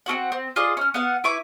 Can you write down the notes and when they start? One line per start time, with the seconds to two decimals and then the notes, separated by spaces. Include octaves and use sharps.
0.06 C4 C#4 F#4 F#5
0.32 C4
0.56 F4 G#4 D5 D#5
0.77 C#4 F6
0.94 B3 F5 F#5
1.24 E4 B4 C#6 D6